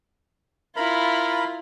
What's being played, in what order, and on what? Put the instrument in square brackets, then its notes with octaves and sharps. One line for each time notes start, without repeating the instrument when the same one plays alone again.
[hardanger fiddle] E4 F4 [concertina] A#4 B5